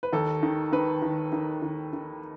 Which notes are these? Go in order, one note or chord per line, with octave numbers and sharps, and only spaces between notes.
B4
D#2 A4
D#3
D#3 B4
D#3
D#3
D#3
D#3